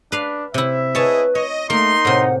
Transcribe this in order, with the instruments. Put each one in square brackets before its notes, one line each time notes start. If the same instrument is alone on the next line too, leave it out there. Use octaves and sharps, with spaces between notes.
[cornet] D4 [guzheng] B4 F5
[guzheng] C3 E4 [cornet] E5
[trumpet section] E4 G#4 D#5 [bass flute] B4 [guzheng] C#5 A5
[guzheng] C#5 [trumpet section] D#5
[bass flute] A3 [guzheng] A#3 [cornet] D#4 [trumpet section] C6
[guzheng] A2 C3 [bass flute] F#5